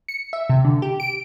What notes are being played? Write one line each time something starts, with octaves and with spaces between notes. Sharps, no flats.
C#7
E5
C3
D3
G4
D7